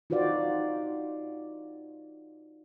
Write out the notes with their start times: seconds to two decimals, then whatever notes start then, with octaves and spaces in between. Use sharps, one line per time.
0.10 D#4 F4 F#4 C5 D5 F5